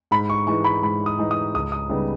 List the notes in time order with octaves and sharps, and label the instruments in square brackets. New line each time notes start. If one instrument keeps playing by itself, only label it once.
[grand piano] G#2 B5
C#6
E3 G#3 D#4 C#6
B5
G#2 B5
D#6
E3 G#3 D#4
D#6
C#2 D#6
D#6
C#3 G3 B3 D#4